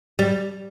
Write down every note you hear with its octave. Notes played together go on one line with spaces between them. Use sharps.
G3